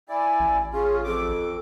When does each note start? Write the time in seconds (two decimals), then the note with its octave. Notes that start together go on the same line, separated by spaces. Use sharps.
0.09 E4 D5 G#5
0.40 A1
0.73 C#4 F4 G#4
1.04 F2 A4 D6